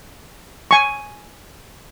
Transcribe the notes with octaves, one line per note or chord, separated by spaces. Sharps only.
G#5 C#6